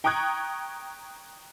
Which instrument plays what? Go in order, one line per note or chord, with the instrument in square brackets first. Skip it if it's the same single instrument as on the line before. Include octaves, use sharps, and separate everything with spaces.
[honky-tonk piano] G5 A#5 C#6 D#6 F#6 G#6